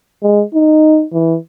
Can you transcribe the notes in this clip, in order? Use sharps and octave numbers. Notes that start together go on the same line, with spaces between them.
G#3
D#4
E3